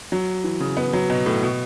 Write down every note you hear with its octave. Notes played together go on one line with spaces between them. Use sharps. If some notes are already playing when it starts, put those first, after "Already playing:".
F#3
E3
C#3
B3
F#3
B2
A2
B2